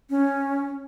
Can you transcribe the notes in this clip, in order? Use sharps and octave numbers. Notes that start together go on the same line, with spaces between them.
C#4